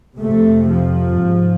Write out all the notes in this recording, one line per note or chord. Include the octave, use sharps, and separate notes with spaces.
F2 C3 A3
F3
G#2